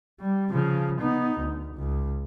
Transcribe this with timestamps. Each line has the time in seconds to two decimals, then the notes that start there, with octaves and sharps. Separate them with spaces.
0.21 G3
0.51 C#3 F3
1.01 B3 D#4
1.40 D2
1.75 C#2